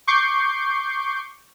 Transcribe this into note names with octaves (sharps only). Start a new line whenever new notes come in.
C#6 D6 G6 C7